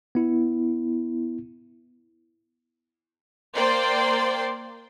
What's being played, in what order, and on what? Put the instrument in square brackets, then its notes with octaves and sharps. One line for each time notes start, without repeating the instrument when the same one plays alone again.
[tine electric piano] B3 E4
[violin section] A#3 C5 D5 G5 C6